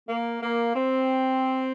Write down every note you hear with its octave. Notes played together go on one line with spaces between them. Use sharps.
A#3
A#3
C4